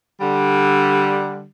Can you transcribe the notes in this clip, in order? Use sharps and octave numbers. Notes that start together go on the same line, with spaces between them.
D3 G3